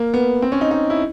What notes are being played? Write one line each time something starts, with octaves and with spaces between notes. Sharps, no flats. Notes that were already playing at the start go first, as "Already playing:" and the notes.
Already playing: A#3
B3
C4
C#4
D#4
D#4
E4